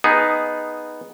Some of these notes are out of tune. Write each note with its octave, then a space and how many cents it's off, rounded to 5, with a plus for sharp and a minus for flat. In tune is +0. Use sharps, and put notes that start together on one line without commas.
B3 +0 D#4 +0 G#4 +0